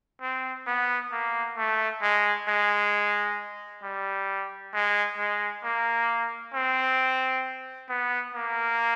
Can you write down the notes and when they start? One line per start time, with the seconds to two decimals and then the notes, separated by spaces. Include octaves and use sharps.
0.21 C4
0.67 B3
1.12 A#3
1.57 A3
2.02 G#3
2.48 G#3
3.83 G3
4.73 G#3
5.18 G#3
5.63 A#3
6.53 C4
7.89 B3
8.34 A#3